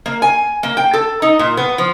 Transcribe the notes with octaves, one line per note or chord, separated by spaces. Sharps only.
A#3
G#5
A#3
G5
A4
D#4
A#2
B3
F3